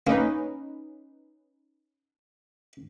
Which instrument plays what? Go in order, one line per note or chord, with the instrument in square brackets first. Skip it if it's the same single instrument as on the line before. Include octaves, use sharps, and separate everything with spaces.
[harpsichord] A#3 [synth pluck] C#4 D#4 B4